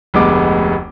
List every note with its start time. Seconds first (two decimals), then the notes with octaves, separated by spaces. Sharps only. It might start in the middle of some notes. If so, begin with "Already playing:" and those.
0.14 F1 D2 G#3 B3 D6